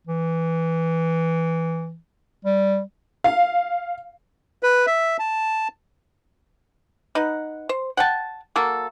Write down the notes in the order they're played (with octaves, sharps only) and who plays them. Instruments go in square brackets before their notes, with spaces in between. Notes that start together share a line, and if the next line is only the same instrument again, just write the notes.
[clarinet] E3
G3
[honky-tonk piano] F5
[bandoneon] B4
E5
A5
[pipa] D#4 B4 F#5
C5
F#5 G5 A5
F#3 A#3 A4